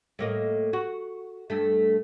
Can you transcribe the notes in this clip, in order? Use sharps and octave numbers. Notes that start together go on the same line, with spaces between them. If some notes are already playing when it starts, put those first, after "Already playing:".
A2 A#3 D#5
F#4
G2 A3